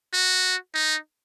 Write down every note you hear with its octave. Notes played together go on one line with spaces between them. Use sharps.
F#4
D#4